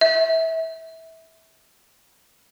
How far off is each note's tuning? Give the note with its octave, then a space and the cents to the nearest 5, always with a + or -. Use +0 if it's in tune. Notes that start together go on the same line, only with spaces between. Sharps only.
E5 -20